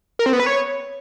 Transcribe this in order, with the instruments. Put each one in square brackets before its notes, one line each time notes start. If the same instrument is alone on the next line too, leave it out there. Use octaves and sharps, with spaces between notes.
[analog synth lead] A#4
C4
B3
B4
C#5